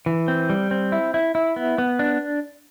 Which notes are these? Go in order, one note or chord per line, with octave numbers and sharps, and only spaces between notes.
E3
C4
G3
C4
E4
E4
E4
B3
B3
D4